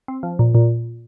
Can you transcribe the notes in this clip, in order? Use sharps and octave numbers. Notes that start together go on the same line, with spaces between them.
C4
F3
A#2
A#2